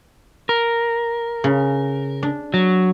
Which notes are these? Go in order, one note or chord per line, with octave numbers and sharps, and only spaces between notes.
A#4
C#3
D4
F#3